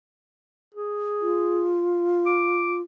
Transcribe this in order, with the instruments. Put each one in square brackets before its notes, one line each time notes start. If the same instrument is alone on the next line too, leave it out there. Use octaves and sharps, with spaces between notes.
[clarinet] G#4
[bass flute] F4
[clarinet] D6